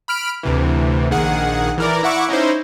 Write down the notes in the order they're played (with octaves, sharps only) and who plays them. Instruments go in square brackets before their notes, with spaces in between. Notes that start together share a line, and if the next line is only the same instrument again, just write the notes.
[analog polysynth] B5 F6 D7
D2 C3 E3
A#1 D#3 G#4 F#5
E3 A#4 D5
E4 E5 F#5 C#6 D6
C#4 D#4 E4 C5